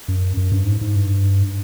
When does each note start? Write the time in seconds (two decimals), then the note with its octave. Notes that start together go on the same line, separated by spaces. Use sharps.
0.08 F#2
0.37 F#2
0.52 G2
0.66 G#2
0.81 G#2
0.95 G2